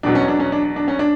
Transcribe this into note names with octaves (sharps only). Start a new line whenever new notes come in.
E2 B2 F#3 D4
C#4
D4
C#4
D4
D4
C#4
D4